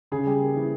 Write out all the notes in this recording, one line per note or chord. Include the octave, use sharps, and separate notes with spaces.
C#3 G#4
G3
A#3
E3